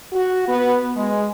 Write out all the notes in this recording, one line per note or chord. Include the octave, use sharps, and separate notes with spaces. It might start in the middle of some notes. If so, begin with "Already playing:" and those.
F#4
B3
G#3